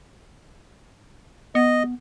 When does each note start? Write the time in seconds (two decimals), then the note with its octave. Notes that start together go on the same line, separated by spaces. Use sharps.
1.55 B3 D#5